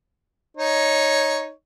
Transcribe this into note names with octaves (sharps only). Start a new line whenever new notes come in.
D#4 C#5